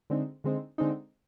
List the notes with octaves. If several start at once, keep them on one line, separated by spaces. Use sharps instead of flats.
D3 G#3 C4 D#4
D3 G#3 C4 D#4
D3 G#3 C4 D#4